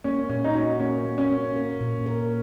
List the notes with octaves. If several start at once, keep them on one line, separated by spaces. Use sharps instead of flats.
A#3 C#4
A#2 C#4
D#4
C#4 F#4
A#3 C#4
A#3
C#4
A#3
A#4
A#2
A#4